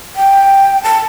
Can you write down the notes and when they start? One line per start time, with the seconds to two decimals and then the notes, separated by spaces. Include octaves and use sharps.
0.16 G5
0.83 A5